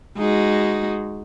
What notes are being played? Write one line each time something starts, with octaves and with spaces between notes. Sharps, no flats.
G#3 D#4 F#4